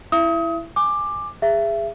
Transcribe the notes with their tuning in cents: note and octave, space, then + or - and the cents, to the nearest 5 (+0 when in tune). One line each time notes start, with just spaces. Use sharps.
E4 +5 E5 +30 D#6 +30
G#5 +0 D6 +15
G#4 -20 E5 +25